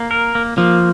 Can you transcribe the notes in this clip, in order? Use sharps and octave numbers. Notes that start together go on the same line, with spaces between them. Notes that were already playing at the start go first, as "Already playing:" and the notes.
Already playing: A#3
A#4
A#3
F3 A#3